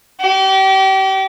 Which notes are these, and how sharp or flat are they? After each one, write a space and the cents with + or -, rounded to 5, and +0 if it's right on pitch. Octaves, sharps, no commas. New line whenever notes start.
G4 -35